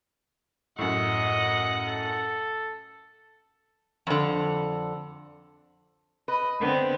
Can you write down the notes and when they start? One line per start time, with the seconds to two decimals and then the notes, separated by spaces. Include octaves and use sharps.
0.79 F#2 A2 D#5 F#5
1.88 A4
4.07 F2 D3
6.28 B4 D#5
6.59 D3 B3 C4